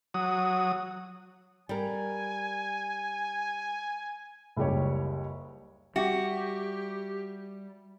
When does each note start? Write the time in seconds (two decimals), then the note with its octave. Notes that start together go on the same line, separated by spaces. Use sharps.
0.14 F#3 D#6
1.69 G3 A#4 G#5
4.56 F#1 C#2 G3 G4 C#5
5.96 G3 F#4 G4 E5 G5